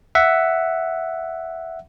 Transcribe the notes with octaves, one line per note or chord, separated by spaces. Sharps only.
E5 F#5